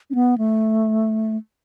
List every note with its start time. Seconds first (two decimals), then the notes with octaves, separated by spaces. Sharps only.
0.10 C#4
0.15 B3
0.38 A3